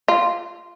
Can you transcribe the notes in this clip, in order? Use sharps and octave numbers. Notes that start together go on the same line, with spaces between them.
F4